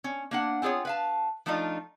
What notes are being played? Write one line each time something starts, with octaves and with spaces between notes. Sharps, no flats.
C#4
A#3 D4 F#5
C4 F4 G#4 C5 C#5
B4 F5 A5
F3 A3 D4 D#4 F4